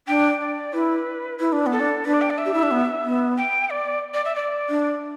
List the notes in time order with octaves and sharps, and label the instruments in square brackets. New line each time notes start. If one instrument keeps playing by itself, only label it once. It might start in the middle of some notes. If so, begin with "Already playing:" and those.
[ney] D4 [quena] G5
[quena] D5
[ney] E4 [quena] B4
[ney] E4
D4
B3
[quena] A4
[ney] D4
[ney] D4 [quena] B4
[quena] D5
G5
D5
E5
[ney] G4
E4
D4
B3
B3
[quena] G5
D5
D5
E5
D5
[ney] D4